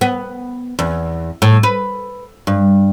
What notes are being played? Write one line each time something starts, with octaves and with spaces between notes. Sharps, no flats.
B3
E2
A2
B4
G2